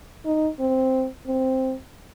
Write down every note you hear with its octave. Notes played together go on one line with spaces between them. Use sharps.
D#4
C4
C4